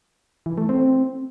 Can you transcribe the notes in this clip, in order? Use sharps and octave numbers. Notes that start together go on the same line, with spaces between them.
E3
A3
C4